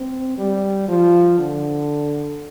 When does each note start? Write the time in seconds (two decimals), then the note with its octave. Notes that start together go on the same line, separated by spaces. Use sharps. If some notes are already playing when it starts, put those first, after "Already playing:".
Already playing: C4
0.37 G3
0.88 F3
1.38 D3